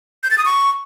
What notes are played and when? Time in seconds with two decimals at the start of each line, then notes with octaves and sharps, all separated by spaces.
0.23 G6
0.31 A6
0.38 D#6
0.45 C#6